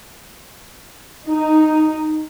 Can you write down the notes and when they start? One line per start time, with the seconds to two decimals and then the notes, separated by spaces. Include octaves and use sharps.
1.27 D#4